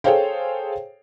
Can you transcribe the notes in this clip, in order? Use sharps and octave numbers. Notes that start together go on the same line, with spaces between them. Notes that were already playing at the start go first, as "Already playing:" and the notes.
G#4 A4 C5 C#5 F5 G5